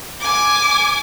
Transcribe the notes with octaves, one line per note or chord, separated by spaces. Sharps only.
G#5 D6